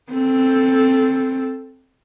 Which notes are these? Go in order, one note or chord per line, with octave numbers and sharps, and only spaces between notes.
C4 A4